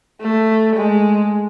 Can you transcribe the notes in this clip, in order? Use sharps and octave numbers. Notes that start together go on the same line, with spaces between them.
A3
G#3